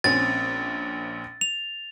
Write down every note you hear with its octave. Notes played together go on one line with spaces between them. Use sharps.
A#1 C4 C#4 A6
F7